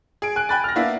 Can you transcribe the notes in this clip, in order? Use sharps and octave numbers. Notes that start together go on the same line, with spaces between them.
G#4 D7
G#5 F#6
G5 G#5 B5 F#6 A6
F6 A#6
A#3 B3 D4 E4 E5 F5